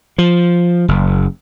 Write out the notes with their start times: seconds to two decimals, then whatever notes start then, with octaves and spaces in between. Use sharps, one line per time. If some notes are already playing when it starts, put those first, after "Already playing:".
0.18 F3
0.88 F#1